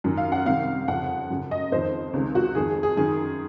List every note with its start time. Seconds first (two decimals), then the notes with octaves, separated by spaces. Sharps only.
0.04 F#2 D#3
0.17 F5
0.32 F#5
0.45 C2 C3 D#3 F5
0.88 F2 C#3 F#5
1.30 F#2 C#3
1.51 D#5
1.72 F2 D#3 C5
2.13 C#2 C3 D#3
2.35 F#4
2.55 F2 D#3 G#4
2.69 G#4
2.83 G#4
2.97 F#2 D#3 G#4